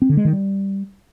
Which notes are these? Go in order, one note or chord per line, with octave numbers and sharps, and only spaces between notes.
C4
D3
G#3
D#3
G3